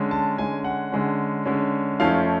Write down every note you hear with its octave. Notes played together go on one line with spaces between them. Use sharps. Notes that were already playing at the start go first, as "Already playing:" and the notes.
Already playing: D3 G#3 C#4
A5
D3 G#3 C#4 G#5
F#5
D3 G#3 C#4
D3 G#3 C#4
F2 F3 A3 C#4 F5